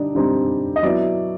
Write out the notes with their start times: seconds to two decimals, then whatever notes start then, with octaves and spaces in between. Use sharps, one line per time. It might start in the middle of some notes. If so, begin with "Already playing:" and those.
Already playing: D3 G3 D#4 D5
0.15 D3 G3 C4 D#4
0.76 D#5
0.83 F#3 B3 E4 D5